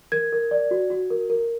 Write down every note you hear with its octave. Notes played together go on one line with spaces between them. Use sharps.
A#4 G#6
A#4
D5
F#4
F#4
A#4
A#4